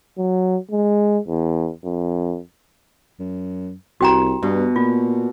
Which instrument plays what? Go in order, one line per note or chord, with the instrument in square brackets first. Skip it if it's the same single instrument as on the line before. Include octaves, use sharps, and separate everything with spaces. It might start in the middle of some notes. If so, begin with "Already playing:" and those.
[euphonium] F#3
G#3
E2
F2
[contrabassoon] F#2
[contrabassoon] C2 [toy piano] F#4 G5 A#5
[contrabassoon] G2 [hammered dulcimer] B2
[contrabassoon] A#2 [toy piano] F4